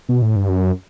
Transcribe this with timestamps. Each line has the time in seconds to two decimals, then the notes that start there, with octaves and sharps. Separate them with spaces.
0.09 B2
0.22 A2
0.36 G2
0.49 F#2